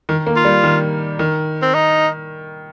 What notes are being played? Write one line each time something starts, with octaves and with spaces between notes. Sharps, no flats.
D#3
A#3
F4
G3
D#3
D#3
C4
D#4